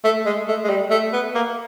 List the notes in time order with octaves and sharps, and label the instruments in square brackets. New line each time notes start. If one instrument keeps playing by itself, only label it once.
[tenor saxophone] A3
G#3
A3
G#3
G3
A3
B3
A#3